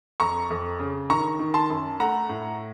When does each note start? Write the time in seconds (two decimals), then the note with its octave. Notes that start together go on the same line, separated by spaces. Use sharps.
0.20 F2 A#5 C#6
0.50 F2
0.79 C#3
1.10 D#3 A#5 C#6
1.39 D#3
1.54 A5 C6
1.70 F#2
1.99 A3 F#5 A#5
2.29 A2